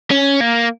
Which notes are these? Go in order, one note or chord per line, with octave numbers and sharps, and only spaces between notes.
C#4
A#3